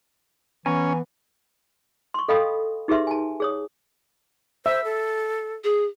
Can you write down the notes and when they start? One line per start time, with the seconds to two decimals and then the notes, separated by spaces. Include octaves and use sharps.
0.66 E3 B3 C#4 G#5 A#5 C#6
2.14 C6 C#6
2.28 A4 D#5 F5 G5 B5 D#6
2.88 D#4 G4 G#4 B4 E5 C6
3.07 G#5 A5
3.40 G#4 C#5 D#6
4.66 C5 E5
4.84 A4
5.64 G#4